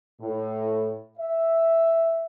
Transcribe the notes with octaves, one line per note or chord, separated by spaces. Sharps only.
A2
E5